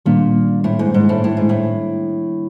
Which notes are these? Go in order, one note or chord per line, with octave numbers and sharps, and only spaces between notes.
A#2 D#3 G3 A#3 D4
A2
G#2
G#2
A2
A2
G#2
A2